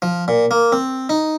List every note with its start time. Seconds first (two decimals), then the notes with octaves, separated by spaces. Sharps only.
0.02 F3
0.28 A#2
0.51 A#3
0.72 C4
1.09 D#4